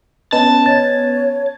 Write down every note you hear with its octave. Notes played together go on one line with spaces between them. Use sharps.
B3 C#4 B4 D#5 A5
C#5 A6